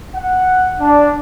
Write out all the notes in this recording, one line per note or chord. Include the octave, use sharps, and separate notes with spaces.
F#5
D4